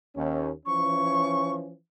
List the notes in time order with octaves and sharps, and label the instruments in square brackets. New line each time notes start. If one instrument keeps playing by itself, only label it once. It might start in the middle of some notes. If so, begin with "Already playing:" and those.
[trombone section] D#2 C#4
[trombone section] E3 F3 C#4 [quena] C#6